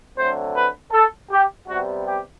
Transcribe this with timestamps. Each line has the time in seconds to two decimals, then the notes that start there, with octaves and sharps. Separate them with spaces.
0.16 D3 F#3 A3 C4 C5
0.55 B4
0.92 A4
1.31 G4
1.68 C3 G3 B3 F#4
2.06 G4